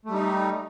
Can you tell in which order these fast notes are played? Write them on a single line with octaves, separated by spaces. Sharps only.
A3 G3 D#4